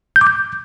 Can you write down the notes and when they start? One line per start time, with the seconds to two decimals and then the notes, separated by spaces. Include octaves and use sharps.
0.16 G6
0.21 D6
0.27 G6